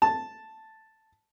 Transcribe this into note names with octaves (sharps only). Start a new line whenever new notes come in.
A5